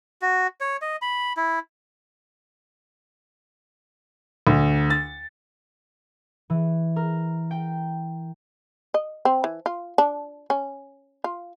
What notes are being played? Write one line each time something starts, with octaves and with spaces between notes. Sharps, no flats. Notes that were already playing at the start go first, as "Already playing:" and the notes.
F#4
C#5
D#5
B5
E4
D2
A6
E3
A#4
G5
D#5
C4
E3
F4
D4
C#4
F4